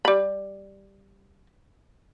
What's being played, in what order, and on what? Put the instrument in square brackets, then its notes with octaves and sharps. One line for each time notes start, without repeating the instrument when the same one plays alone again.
[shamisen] G3 B5